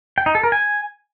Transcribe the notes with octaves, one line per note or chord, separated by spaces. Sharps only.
G5
D#4
A4
A#4
G#5